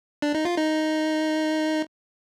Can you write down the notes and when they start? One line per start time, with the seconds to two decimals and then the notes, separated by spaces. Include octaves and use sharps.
0.22 D4
0.34 D#4
0.45 F4
0.57 D#4